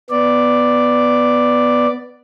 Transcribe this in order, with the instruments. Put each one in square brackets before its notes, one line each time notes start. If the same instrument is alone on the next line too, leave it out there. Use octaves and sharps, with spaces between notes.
[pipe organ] B3 D5